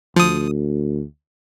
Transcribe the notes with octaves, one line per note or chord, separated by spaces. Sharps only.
D2 F3 D#6